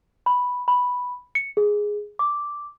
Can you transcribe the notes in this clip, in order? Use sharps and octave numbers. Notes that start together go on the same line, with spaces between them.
B5
B5
C#7
G#4
D6